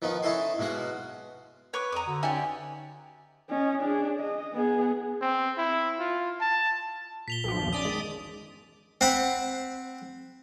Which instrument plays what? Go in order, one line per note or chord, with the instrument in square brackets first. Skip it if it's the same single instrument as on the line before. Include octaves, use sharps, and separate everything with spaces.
[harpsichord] D#3 F3 B3 D#4
C#4 D#4 E4 A4 G#5 C6
B1 B2 G#3 F#4 F5
[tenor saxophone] B4 [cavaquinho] C#5 C#6 D6
[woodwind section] F2 D#6 [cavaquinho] A#5 D6
[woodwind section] D3 [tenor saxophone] F#4
[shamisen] C#4 E5 G#5 [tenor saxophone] D#4 [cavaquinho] G4 C#5 D5
[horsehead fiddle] C#4 D#5
D4 G#4
D#5
B3 G#4
[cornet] C4
E4
F4
A5
[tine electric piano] A#2 [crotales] B6 F7 G7
[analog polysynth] B1 F3
[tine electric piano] G1 E2
[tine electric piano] C#4 [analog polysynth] D5 D6 D#6
[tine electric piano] D#3 G#3
[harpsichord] C4 F#5 B5